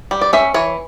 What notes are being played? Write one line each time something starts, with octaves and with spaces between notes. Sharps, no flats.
G3
D5
C#4 E5
E3 C#5